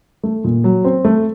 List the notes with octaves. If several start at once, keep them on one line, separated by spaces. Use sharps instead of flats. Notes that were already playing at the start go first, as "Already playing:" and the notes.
A3
A#2
F#3
C4
A3